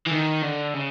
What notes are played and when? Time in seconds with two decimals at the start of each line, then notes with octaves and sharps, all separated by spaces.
0.07 E3
0.12 D#3
0.43 D3
0.74 C#3